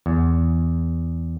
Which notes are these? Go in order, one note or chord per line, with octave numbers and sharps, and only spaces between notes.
E2